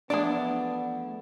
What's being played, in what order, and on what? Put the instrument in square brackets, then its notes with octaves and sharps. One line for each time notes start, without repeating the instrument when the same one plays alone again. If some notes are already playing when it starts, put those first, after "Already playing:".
[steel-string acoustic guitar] E2 F3 A3 [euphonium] B3 [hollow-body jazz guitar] D4 [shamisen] G#4 D5